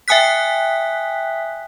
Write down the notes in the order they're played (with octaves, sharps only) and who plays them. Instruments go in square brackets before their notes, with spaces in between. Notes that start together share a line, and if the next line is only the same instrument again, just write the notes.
[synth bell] E5 G5 G#5 D#6 F#6 B6